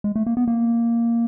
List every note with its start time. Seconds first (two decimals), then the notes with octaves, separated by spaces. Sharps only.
0.04 G#3
0.16 A3
0.27 A#3
0.37 B3
0.48 A#3